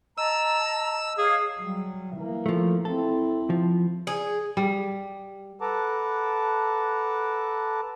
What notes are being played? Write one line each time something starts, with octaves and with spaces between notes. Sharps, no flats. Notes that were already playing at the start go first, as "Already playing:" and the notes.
D#5 A5 A#5 E6
G#4 C#5 F5
F#3 G3
E3 A#3
F3 A3
C4 E4 A4
F3
G#4
G3
A4 B4 F#5 A5 A#5 D6